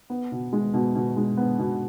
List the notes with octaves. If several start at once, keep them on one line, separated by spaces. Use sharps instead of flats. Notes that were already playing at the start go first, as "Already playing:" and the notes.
B3
B2
G#3
B2
B2
G#3
B3
B2